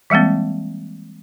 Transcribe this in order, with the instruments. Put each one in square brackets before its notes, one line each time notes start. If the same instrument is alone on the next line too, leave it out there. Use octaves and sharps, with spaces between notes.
[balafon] E3 G3 G#3 A#3 C4